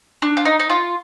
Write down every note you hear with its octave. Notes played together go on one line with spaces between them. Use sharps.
D4
F4
D#4
D#4
F4